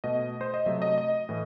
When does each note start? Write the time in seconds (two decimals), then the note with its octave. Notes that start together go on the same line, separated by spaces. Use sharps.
0.04 B2 A3 D#5
0.41 C5
0.54 D#5
0.66 C3 F#3 A3 E5
0.82 D#5
0.98 D#5
1.29 A2 E3